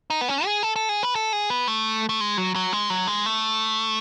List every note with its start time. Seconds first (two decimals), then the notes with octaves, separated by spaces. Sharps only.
0.10 D#4
0.21 B3
0.28 C#4
0.45 G#4
0.63 A4
0.76 A4
0.89 G#4
1.03 B4
1.15 A4
1.33 G#4
1.50 B3
1.68 A3
2.09 A3
2.21 G#3
2.37 F#3
2.56 F#3
2.73 G#3
2.90 F#3
3.07 G#3
3.26 A3